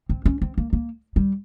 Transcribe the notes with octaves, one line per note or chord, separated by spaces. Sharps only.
C4
C#4
C4
A#3
A#3
G3